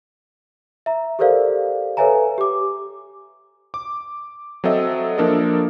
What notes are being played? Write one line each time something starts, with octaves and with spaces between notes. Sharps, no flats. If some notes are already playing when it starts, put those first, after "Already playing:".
E5 A#5
G4 A4 A#4 C5 D5 F5
A4 B4 C#5 E5 G#5 A#5
G4 D6
D6
F#3 C4 A4 D#5 E5
F3 A#3 D4 A4 A#4 D#5